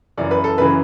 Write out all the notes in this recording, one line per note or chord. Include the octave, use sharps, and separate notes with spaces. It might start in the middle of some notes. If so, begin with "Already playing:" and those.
F#2 C#3 E3 D5
B4
A4
F#2 C#3 E3 B4